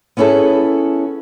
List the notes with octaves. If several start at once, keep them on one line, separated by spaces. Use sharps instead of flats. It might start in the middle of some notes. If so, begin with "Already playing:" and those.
B3 C#4 E4 G#4 A4